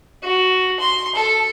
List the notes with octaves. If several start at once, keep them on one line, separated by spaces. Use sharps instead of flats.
F#4
C6
A4